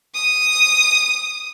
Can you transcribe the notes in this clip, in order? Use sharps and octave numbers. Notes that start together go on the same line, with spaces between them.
D#6